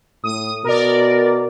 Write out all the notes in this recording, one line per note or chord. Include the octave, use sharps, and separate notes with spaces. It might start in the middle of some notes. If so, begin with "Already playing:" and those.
A2 D#6
B2 A#4 D5